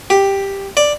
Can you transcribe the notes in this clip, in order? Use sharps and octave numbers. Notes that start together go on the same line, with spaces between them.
G4
D5